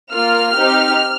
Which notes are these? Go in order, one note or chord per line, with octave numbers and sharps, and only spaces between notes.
A#3 F4 F6
C4 D#4 G4